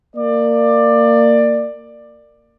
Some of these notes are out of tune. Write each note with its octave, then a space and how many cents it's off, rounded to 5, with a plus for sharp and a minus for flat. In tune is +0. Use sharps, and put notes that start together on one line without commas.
A#3 -20 D5 +15